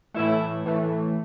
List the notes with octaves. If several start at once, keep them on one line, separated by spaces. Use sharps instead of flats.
A2 E3 A3 E4
A2 E3 A3